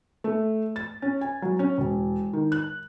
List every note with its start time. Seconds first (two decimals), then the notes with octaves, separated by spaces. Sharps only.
0.24 A3
0.76 A6
1.02 C#4
1.21 G#5
1.42 F#3
1.59 C#4
1.78 E1
2.33 D#3
2.52 F#6